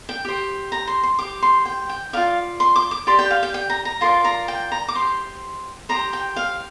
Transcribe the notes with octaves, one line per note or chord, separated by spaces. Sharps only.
G5
G4 C5
A#5
C6
C6
G4 C5 D6
C6
G5
G5
F4 A#4 D5 F5
C6
D6
D6
G4 D5 C6
G5
F5
G5
G5
A#5
A#5
F4 A#4 D5 C6
A#5
G5
A#5
D6
G4 C5 C6
G4 C5 A#5
G5
F5